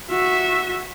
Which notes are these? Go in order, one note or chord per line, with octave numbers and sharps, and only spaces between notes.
F#4 E5